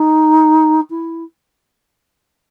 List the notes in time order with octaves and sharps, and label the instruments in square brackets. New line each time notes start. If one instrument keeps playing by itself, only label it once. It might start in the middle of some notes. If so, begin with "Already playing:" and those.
Already playing: [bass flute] D#4
E4